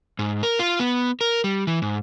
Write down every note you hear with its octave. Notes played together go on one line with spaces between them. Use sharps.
G#2
A#4
F4
B3
A#4
G3
E3
G#2